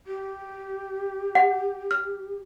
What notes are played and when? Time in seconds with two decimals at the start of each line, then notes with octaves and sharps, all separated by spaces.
0.07 G4
1.35 F#5
1.91 F6